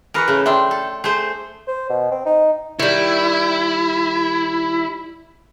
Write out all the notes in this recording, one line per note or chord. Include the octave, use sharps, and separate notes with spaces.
E3 G#4 A#4 B4 C#6
C#3 A3
D4 E5 G5 C6
A4
A3 G#4 C5
C5
B2
C4
D#4
D#3 G3 E4